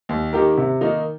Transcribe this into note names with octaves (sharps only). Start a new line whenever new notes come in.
D#2
D#3 A#3 G4 A#4
C3
D#3 A#3 D#4